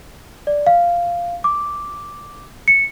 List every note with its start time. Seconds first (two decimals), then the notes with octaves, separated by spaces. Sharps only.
0.47 D5
0.67 F5
1.44 D6
2.68 C#7